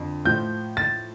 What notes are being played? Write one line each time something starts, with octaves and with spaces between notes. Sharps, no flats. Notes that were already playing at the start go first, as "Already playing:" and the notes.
Already playing: F2 D3
A2 F3 G6
A6